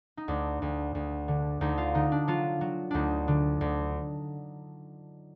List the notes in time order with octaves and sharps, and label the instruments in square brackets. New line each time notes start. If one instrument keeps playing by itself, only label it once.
[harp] D#4
D2 D4
D2
D2
D3
D2 D#4
F4
D3 D#4
D4
F#3 F4
F#3
D2 D4 D#4
D3
D2